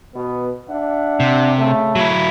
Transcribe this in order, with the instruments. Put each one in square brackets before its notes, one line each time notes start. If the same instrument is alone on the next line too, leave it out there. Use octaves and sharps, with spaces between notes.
[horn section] B2 B3
D4 E5 F#5
[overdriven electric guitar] C3
[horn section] C#3 A3
[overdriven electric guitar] F#3 E4